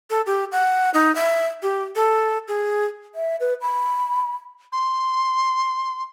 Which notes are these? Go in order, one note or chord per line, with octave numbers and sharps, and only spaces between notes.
A4
G4
F#5
D#4
E5
G4
A4
G#4
E5
B4
B5
C6